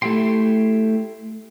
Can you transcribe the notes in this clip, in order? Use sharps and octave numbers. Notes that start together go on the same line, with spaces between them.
A3 E4 G4 G5 C6